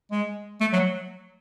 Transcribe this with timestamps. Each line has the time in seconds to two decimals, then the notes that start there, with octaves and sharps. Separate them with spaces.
0.11 G#3
0.61 A3
0.73 F#3